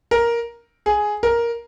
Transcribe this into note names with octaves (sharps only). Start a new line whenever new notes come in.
A#4
G#4
A#4